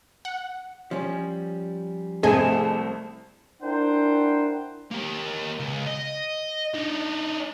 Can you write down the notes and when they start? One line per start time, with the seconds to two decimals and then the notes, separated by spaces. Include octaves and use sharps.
0.25 F#5
0.91 F3 G3 C#4
2.23 C2 A3 C4 G#4 D#5 G#5 A5
3.62 D4 E4 A#4 C5 F#5 G5
4.91 A#3 G4
5.60 C#2
5.87 D#5
6.74 D4 D#4